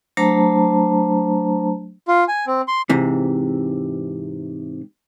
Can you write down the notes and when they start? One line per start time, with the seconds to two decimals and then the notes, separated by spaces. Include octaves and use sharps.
0.17 F#3 A3 D4 C5 A5 A#5
2.08 F4
2.28 G#5
2.47 C4
2.68 C6
2.89 G#2 C3 E3